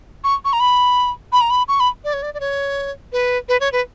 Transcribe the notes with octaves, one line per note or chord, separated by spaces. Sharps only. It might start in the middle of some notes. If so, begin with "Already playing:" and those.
C#6
C#6
A#5
B5
B5
A#5
B5
C#6
B5
D5
C#5
D5
D5
C#5
B4
B4
C#5
B4